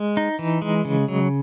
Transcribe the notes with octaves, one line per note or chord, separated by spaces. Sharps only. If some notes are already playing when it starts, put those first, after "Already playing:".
Already playing: G#3
D#4
E3
G#3
C#3
F#3